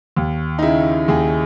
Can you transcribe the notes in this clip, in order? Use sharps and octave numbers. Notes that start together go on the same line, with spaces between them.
D#2
D#4
C#3 E4
D#2 G#4